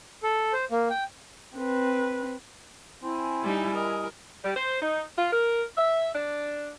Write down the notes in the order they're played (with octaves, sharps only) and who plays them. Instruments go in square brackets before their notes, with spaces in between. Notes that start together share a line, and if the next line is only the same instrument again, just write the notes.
[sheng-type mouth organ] A4
C5
A#3
G5
[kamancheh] C4 B4
[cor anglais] C4 [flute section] E4 G#5
[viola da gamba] G3 D#4
[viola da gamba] A#4 [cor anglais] D#5
[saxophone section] G3
C5
D#4
F4
A#4
E5
D4